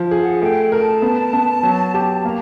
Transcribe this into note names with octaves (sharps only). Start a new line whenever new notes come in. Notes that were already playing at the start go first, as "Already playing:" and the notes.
Already playing: F3
G#4
F#5
A3 G5
A#4 A5
B3
B3
F#3
G4
A#3 A#5